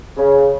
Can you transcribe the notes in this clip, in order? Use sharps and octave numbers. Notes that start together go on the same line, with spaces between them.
C#3